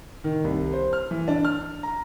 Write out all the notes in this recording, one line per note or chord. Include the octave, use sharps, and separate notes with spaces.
D#3
C2
C5
F6
E3
D4
F6
A#5